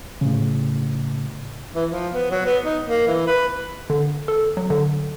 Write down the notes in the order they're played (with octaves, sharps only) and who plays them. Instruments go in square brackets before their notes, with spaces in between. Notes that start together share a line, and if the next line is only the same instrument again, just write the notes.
[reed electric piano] A2 C#3
[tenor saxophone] E3
F3
B3
F#3
B3
D#4
A#3
E3
B4
[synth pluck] D3
A4
F#3
D3